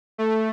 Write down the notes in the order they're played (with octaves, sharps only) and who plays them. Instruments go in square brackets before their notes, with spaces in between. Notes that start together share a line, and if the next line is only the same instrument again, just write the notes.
[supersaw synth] A3